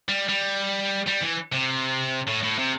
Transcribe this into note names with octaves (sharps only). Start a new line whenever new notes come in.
G3
G3
G3
E3
C3
A2
A2
C3